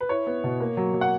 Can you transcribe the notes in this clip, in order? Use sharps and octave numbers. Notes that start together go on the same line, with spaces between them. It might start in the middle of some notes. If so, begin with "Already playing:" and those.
B4
E4 C#5
B3
B2
A#3
F#3
F#3
F#5